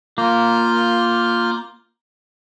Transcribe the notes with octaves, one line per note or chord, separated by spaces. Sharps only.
A#3 F4 F6 G6